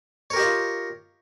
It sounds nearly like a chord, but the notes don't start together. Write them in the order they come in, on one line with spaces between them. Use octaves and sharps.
C#5 A#4 G4 D#5 F4